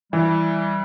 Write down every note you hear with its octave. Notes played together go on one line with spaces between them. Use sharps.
E3 G3